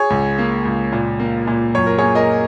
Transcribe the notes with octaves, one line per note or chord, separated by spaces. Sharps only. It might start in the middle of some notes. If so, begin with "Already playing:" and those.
Already playing: G#4 C#5
C#2
A#3
C#2
A#2
A#3
A#2
F#2 C#5
A#4
G#4 C#5
A#3
A#4 D#5